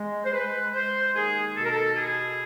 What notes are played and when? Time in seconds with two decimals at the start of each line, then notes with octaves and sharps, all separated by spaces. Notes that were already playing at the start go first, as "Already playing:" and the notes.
Already playing: G#3
0.24 C5
0.32 G#3 B4
0.72 G#3 C5
1.14 D#2 G#4
1.55 B2 A4
1.62 A#4
1.71 A4
1.96 E4 G#4